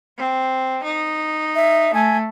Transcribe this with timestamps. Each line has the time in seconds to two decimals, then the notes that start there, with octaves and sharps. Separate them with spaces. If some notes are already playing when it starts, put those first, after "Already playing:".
0.18 C4
0.84 D#4
1.55 E5
1.94 A3 G#5